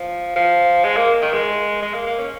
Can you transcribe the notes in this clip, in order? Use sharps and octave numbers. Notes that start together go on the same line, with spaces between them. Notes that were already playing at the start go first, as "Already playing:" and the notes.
Already playing: F3
F3
G#3
A#3
D#3
G#3
G#3
A#3
A#3
C#4